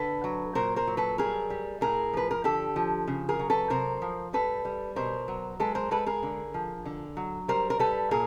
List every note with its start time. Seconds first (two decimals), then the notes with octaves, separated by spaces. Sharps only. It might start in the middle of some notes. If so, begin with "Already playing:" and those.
Already playing: D3 A4 B4
0.24 F#3
0.55 A#2 A#4 C5
0.76 A#4 C5
0.87 F#3
0.97 A4 B4
1.18 G3 G#4 A#4
1.50 G3
1.81 A2 G#4 A#4
2.13 F3 B4
2.31 A#4
2.44 D3 G4 A4
2.76 F3
3.07 C#3
3.29 G#4 A#4
3.39 F#3
3.50 A4 B4
3.70 C3 A#4 C5
4.02 F3
4.33 G3 A4 B4
4.65 G3
4.96 B2 A#4 C5
5.28 F#3
5.60 G#3 A4 B4
5.75 A#4 C5
5.91 G#3 A4 B4
6.06 G#4 A#4
6.23 D3
6.54 F3
6.85 D3
7.17 F#3
7.48 G3 A#4 C5
7.70 A#4
7.79 G3 A4 B4
8.11 A#2 G#4 A#4